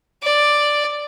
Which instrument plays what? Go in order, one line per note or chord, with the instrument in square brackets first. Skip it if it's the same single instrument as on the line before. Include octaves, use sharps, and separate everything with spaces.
[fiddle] D5